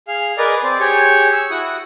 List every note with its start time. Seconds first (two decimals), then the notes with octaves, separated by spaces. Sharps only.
0.08 G#4 F5
0.38 G#4 A#4 B4 D5 D#5
0.63 C4 C5 D5
0.80 G4 G#4 C#5 G#5 C#6
1.33 C#6 E6
1.51 E4 F#4 F#5 D#6